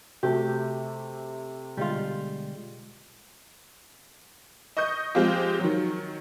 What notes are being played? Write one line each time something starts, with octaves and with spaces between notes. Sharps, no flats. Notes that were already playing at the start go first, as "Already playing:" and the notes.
C3 A3 F#4 G4
B2 D3 G3 G#3 F4
D#5 C#6 D#6 G6
F3 G#3 C4 F4 G4
D#3 F#3